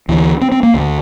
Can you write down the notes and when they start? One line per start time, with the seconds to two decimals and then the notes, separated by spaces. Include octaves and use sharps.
0.08 D2 D3 E3
0.41 C4
0.52 C4
0.63 A#3
0.74 D2 D3